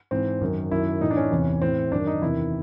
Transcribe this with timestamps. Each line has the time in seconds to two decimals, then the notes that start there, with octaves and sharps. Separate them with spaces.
0.11 G#2 E3 C4
0.41 F#2 D#3
0.71 F#2 D#3 E4
1.01 A2 E3 D#4
1.11 D4
1.17 C#4
1.32 E2 C3 E3
1.61 A2 E3 C4
1.92 F#2 D#3 D4
2.07 D#4
2.22 E2 C3 D#3 E4